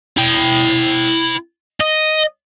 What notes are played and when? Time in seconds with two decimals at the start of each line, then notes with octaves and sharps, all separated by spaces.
0.17 E4 G5
1.80 D#5